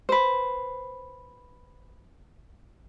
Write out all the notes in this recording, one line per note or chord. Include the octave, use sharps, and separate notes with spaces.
B4 C5